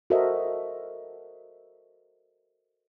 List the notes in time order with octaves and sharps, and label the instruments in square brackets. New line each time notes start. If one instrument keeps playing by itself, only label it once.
[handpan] F#4 A4 A#4 C5 D#5 E5